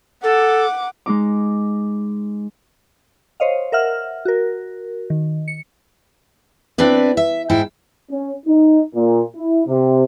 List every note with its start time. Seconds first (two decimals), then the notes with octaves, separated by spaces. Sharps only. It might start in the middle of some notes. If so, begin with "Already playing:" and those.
0.23 A4 F#5 D6
1.06 G#3 D#4 D6
3.40 C5 C#5 D#5 F5
3.72 A#4 E5 F#5 F6
4.25 F#4 A#4
5.10 D#3
5.48 C#7
6.78 C4 D4 E4 B4 D5
7.17 E5
7.50 G#2 E4 G5
8.10 C#4
8.46 D#4
8.95 A#2
9.35 E4
9.67 C3